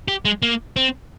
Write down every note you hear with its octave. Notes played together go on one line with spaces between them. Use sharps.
G4
G#3
A#3
C4